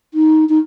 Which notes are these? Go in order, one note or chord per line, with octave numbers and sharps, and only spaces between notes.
D#4
D#4